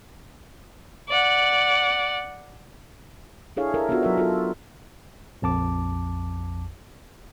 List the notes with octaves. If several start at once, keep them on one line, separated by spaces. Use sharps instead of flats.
D5 F#5
D4 E4 G#4 A4 C#5 F5
E4 A4 A#4 E5
B3 D4 D#4 F4 F#4
F#3 A#4 E5
F4 A4
A#1 F2 A5 D6